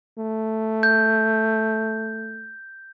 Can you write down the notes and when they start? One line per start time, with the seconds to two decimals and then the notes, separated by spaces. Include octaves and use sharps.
0.18 A3
0.83 G6